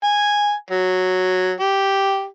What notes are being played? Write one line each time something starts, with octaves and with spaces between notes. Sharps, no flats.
G#5
F#3
G4